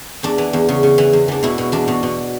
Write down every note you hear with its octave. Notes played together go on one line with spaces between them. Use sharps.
E2 D4
E3
E2
C#3
C#3
E3
E2
E3 D4
B2 E4
B2
E2 D4
B2
B2